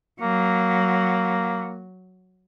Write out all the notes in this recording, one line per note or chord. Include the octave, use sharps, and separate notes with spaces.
F#3 A#3